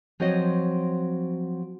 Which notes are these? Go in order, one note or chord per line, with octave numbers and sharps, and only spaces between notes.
F3 F#3 C4 F#4 C#5 D#5